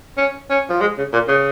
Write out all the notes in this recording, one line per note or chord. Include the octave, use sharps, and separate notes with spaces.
C#4
C#4
F3
G#3
C#3
A#2
C#3